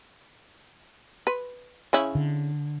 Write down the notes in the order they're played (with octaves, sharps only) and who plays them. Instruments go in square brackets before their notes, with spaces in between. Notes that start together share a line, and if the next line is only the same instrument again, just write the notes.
[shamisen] B4
C#3 C#4 E4
[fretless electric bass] D3